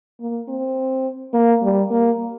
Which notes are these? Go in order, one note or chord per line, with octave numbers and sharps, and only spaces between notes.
A#3
C4
A#3
G3
A#3